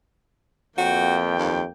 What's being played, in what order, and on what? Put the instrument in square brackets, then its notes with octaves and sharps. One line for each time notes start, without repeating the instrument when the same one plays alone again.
[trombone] F2 [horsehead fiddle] A#3 G5 [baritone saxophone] F#4
[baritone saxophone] D#2